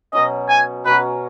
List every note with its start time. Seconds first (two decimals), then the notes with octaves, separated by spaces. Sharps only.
0.13 B2 F#3 C#4 D#5
0.49 G#5
0.85 B2 F#3 C#4 B4